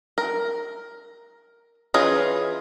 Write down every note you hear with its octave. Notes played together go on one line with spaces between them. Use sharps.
A#4
E3 C#4 F4 G#4 D#5